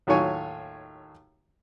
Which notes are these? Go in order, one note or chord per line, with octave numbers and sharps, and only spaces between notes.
D#2 A2 F#3 F4 C#5 G#5